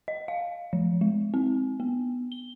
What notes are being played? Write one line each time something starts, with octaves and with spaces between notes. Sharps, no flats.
D#5
F5
F3
G#3
C4
B3
G7